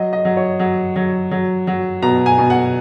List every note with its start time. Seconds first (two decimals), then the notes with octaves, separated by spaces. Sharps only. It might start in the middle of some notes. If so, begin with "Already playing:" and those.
Already playing: F#3 D#5
0.13 D#5
0.25 F#3
0.37 C#5
0.60 F#3
0.96 F#3
1.31 F#3
1.67 F#3
2.02 B2 A#5
2.26 G#5
2.38 B2
2.50 F#5